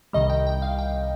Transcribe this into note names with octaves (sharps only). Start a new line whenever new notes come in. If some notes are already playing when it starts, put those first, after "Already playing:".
C2 C3 D#3 G3 D#5
G5
G5
F5
G5